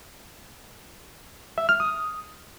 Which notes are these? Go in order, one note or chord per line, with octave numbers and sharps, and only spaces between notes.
E5
F6
D#6